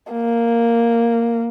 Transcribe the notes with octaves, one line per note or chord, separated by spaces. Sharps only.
A#3